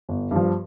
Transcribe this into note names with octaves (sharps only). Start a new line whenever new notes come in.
G1
G2 F3